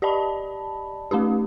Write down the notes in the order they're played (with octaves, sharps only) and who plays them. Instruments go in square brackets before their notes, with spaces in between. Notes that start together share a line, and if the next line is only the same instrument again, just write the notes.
[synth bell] G4 D5 D#5 A5 B5
A3 C#4 D#4 G4